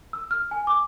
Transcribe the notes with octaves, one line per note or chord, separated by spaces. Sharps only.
E6
F6
G#5
D6